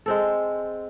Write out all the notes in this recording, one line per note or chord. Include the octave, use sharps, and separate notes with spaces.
G#3 C4 A4